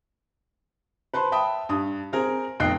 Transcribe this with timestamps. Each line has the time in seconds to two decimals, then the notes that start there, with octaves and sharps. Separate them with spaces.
1.14 B4 C5 A5 C6
1.32 E5 G5 A5 B5 D#6
1.69 G2 D#6
2.13 C4 G#4 A#4 C5
2.60 F1 B1 D#5 G5 F#6 C7